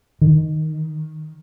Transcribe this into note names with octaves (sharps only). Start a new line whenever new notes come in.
D#3